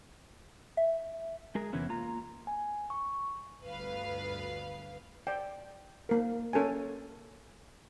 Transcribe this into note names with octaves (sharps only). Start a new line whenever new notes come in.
E5
G#3 G#4 A#4
E2 C3 E3 B3 C#4 E4
A#3 F4 A#5
G#5
C#6
G1 D2 B4 F5
D5 G5
A#3 A#4
C#4 A4 A#4 G#5